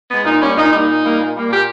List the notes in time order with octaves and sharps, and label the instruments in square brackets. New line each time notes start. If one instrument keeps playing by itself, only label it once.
[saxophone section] G#3 B3
A#2 D#4
G3 A#3 C#4
A#2 D#4
G3 A#3 D#4
A#2
G3 A#3
A#2
G3 A#3
A#2 G4